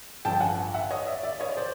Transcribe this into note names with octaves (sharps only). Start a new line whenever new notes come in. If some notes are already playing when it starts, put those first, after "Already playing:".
A1 G2 D3 F3 G5 A5
F#5 G#5
E5 F#5
C#5 D#5
D5 E5
D5 E5
C#5 D#5
C5 D5